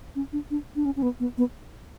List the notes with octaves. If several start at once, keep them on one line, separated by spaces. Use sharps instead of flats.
C#4
D4
D4
D4
C#4
C#4
B3
B3
B3